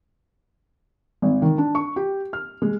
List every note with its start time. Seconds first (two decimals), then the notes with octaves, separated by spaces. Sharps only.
1.22 G#1
1.42 D#3
1.58 D4
1.75 C#6
1.96 G4
2.33 F6
2.62 G#3